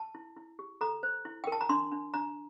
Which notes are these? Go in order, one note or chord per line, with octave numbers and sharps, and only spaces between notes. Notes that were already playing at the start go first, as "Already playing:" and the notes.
Already playing: A5
E4
E4
G4
A4 A#5
C5
E4
A#4 G5
A5
A#5
D4 C6
D4
D4 A#5